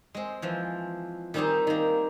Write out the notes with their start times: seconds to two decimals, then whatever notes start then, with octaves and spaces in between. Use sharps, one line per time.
0.15 G#3 C4
0.42 E3 F3
1.34 D#3 G3 C4 D#4 G4 G#4
1.67 D#3 A#3